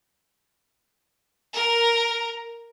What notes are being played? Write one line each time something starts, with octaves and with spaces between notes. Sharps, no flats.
A#4